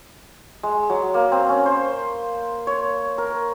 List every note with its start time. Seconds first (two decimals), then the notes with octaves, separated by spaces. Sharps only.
0.63 G#3
0.90 F#3
1.14 A#3
1.32 C4
1.49 C#4
1.66 C5
2.67 C#5
3.18 A#4